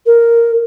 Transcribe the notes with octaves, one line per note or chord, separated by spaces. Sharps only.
A#4